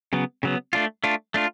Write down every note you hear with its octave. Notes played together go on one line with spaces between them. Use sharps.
C#3 F#3 B3
C#3 F#3 B3
A3 D4 F4
A3 D4 F4
A3 D4 F4